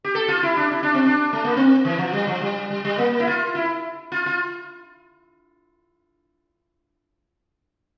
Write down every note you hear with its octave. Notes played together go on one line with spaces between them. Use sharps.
G4
A4
F4
E4
D4
E4
D4
C4
D4
A3
A#3
C4
E3
F3
G3
F3
G3
G3
G3
A#3
E4
F4
E4
F4
F4